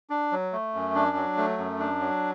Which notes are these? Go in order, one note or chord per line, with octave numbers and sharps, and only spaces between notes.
D4
F#3
A3
F#2
D4
F#3
A3
F#2
D4
F#3